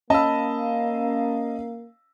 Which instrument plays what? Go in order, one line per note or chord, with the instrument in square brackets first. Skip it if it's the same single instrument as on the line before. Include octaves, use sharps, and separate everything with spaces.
[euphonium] A#3 [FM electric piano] C#4 F5 [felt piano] D#5 E6 [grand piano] A5 B5